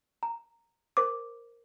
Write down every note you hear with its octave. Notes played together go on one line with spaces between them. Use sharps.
A#5
A#4 C5 D6